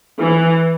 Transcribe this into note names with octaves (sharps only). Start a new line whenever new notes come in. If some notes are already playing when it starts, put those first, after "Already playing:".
E3